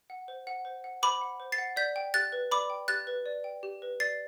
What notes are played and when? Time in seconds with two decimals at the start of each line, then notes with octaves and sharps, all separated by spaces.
0.10 F#5
0.28 C5
0.47 F#5
0.65 C5
0.84 F#5
1.02 C5 B5 D6
1.21 F#5
1.40 C5
1.52 A6 C7
1.58 F#5
1.76 D5 G6 B6
1.96 G5
2.14 G4 F#6 A6
2.32 B4
2.51 D5 B5 D6
2.70 G5
2.88 G4 F#6 A6
3.07 B4
3.26 D5
3.44 G5
3.63 G4
3.82 B4
4.00 D5 A6 C7